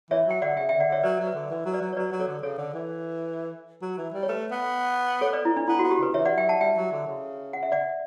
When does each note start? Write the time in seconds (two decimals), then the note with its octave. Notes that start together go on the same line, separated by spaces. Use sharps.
0.10 E3 C#5 E5
0.27 F#3 G5
0.42 D3 D5 F#5
0.57 C#3 E5 G5
0.69 E5 G5
0.73 D3
0.80 D5 F#5
0.88 D3 C#5 E5
1.03 F#3 B4 D5
1.19 F#3
1.27 B4
1.35 D3
1.50 E3
1.65 F#3
1.73 B4 D5
1.81 F#3
1.93 C#5
1.97 F#3 B4 D5
2.12 F#3
2.20 A4 C#5
2.27 D3
2.43 C#3 A4 C#5
2.58 D3
2.74 E3
3.82 F#3
3.97 E3
4.14 G3
4.23 C#5
4.28 A3 B4
4.51 B3
5.21 A4 C#5
5.33 B4 D5
5.45 E4
5.57 D4
5.68 B3 E4
5.79 F#4
5.84 B3
5.91 G4
5.98 C#3 B4
6.14 E3 C#5 E5
6.25 D5 F#5
6.37 F#3 E5 G5
6.49 F#5 A5
6.61 G3 E5 G5
6.76 F#3
6.92 D3
7.07 C#3
7.53 F#5
7.63 E5
7.72 D5 F#5